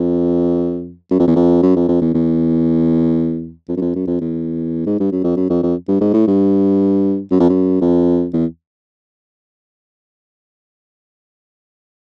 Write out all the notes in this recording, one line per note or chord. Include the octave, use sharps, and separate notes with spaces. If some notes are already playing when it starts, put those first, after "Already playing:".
Already playing: F2
F#2
F2
E2
F2
F#2
F2
F2
E2
E2
F2
F#2
F2
F#2
F2
E2
G#2
G2
F#2
F2
F#2
F2
F2
G2
G#2
A2
G2
F#2
F2
F#2
F2
E2